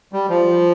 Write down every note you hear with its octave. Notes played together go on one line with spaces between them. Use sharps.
G3
F3